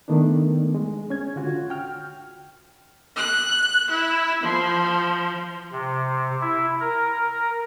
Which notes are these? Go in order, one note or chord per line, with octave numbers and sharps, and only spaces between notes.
D#3 A3 B3 D4
G#3
C#4 G#6
D3 F4 F#4
G5 F6
F#6
E4
F3
C3
E4
A#4